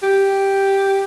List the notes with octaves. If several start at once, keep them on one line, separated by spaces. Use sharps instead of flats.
G4